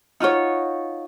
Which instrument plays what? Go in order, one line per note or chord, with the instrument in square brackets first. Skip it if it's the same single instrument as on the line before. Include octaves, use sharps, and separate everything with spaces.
[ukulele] D#4 F4 F#4 C#5